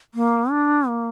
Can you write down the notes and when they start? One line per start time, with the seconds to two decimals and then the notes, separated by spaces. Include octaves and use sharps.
0.14 A#3
0.51 D4
0.88 A#3